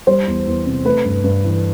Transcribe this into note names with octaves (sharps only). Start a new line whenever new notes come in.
G3 C5
E2
E2
C3
A3 B4
G2
G2
E3